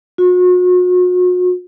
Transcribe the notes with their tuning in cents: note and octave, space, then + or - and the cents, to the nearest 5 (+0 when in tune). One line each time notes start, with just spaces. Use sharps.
F#4 -40